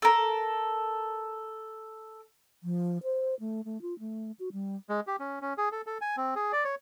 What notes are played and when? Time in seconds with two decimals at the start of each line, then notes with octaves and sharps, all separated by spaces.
0.02 A4 A#4
2.63 F3
3.03 C5
3.40 A3
3.65 A3
3.82 F4
3.99 A3
4.39 F#4
4.53 G3
4.89 G#3
5.07 G4
5.20 C#4
5.42 C#4
5.58 G#4
5.72 A4
5.86 A4
6.01 G#5
6.17 C4
6.36 G#4
6.52 D5
6.65 C#5